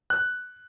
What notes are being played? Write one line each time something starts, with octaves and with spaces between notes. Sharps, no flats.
F#6